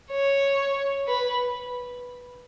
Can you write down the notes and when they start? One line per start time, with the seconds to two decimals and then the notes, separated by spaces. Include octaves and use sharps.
0.11 C#5
1.07 B4